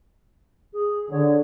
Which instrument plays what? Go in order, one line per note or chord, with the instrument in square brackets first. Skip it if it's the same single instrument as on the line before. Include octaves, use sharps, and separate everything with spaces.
[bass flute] G#4
[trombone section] D3 [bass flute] C#5